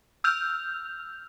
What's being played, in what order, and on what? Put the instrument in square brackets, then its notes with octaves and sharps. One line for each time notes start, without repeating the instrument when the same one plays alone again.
[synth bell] E6 F6 G6 F7